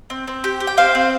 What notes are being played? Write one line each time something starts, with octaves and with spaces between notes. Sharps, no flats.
C4
C4
G4
G4
G5
C4 C5 F5
C4